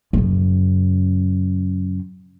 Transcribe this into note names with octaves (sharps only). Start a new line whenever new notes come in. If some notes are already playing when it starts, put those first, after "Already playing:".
F#2 C#3